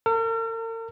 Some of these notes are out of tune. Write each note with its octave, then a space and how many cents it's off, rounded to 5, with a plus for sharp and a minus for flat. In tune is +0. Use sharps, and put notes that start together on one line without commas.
A#4 -45